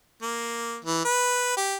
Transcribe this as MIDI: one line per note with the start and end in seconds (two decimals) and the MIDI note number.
0.22 0.76 58
0.85 1.02 52
1.05 1.53 71
1.57 1.77 67